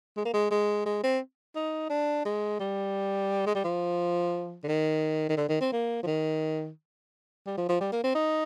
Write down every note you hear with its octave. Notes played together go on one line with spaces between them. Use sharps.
G#3
A#3
G#3
G#3
G#3
C4
D#4
D4
G#3
G3
G#3
G3
F3
D3
D#3
D#3
D3
D#3
C4
A#3
F3
D#3
G3
F3
F3
G3
A#3
C4
D#4